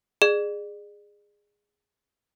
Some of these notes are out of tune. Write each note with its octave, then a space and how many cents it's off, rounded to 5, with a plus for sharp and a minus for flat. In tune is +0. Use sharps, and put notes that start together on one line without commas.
G#4 -10 D5 +40